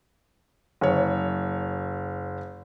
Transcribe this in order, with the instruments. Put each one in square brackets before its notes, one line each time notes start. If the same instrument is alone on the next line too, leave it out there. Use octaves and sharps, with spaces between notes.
[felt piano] F#1 C#5